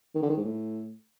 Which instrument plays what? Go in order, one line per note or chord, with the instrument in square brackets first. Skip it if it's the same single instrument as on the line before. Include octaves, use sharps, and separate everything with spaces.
[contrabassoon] D#3
D3
D#3
G#2
A2